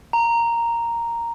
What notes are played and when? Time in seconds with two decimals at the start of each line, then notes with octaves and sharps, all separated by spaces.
0.13 A#5